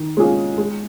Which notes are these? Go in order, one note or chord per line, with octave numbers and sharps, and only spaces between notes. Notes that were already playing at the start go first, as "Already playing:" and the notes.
Already playing: D#3
G#3 C#4 F4 G#4
G#3